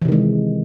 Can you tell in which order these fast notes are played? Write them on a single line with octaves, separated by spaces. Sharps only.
E3 C3 D#3 G#3